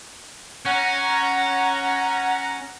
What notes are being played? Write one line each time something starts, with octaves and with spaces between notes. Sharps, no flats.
C#4 F#5 A#5